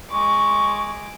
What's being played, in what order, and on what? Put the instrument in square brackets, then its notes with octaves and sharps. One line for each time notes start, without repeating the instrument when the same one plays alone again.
[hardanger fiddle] G#3 D6 [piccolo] C#6